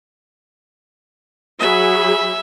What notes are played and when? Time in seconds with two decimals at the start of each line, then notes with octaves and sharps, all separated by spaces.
1.60 F#3 G#4 E5 B5